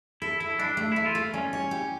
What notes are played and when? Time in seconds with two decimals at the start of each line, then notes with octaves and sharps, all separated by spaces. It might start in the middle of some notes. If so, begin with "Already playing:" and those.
0.22 E4 A4
0.40 E4 A4
0.59 G3 D4
0.77 A3
0.92 A3 E4
1.06 F4
1.15 A3
1.34 G3 C#4
1.53 C#5
1.71 G4